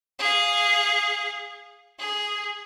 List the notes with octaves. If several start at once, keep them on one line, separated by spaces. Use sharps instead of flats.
G#4 F5
G#4